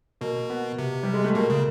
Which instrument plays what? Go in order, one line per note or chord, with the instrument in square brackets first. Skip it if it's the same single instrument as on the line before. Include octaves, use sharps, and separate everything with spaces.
[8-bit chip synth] B2 [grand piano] A#3
[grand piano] B3
[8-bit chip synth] C3
[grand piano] G3
G#3
A3
[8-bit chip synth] B2 [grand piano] A#3
[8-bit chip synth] C#3